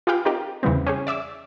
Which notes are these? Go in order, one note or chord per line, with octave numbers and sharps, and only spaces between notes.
F4 G4 G#4 B4 F5 G5
C4 D#4 F4 G4 A#4
E2 C#3 E3 G3 B3 C4
C#4 G4 G#4
D5 E5 D6 E6